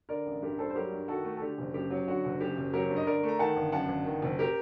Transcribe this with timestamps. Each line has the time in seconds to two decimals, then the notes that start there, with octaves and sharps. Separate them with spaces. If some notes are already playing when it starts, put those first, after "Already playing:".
0.09 D3 A#4 D5
0.26 A1
0.42 G2 G4 A#4
0.59 G3 A4 C5
0.70 C5
0.75 F#3 G4 A#4
0.92 G2
1.08 D#3 F#4 A4
1.24 A3
1.37 A4
1.42 D3 G4
1.58 F#1
1.74 F#2 G4
1.90 F#3
2.08 D3 F#4
2.25 F#1
2.41 F#2 G4
2.57 F#1
2.73 F#3 G4 A#4
2.90 G2
2.96 D#5
3.07 D3 A#4 D5
3.23 A3
3.29 A#5
3.39 D#3 F#5 A5
3.56 G1
3.72 F#2 F#5 A5
3.88 G1
4.05 D#3
4.22 F#1
4.39 G4 A#4